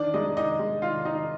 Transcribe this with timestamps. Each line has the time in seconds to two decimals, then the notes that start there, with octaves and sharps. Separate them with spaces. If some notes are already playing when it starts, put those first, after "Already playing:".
Already playing: D#3 D4 D5
0.14 G#3 D#4 D#5
0.37 D#3 D#4 D#5
0.59 G#3
0.82 D#3 F4 F5
1.05 D#3 D#4 D#5